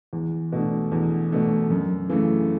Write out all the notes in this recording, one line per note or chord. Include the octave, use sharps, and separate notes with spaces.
E2
B2 A3 D4
E2
B2 A3 D4
F#2
C#3 E3 A3